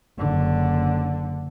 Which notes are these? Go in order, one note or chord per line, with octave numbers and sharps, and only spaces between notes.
F#1 D3